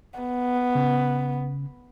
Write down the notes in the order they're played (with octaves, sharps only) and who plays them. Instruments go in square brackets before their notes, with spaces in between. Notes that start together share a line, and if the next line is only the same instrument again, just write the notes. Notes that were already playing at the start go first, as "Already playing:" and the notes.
[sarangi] B3
[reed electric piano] C#3